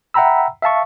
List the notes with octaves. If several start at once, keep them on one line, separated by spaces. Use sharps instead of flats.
E5 F#5 G5 A#5 B5 E6
E5 F5 A5 C#6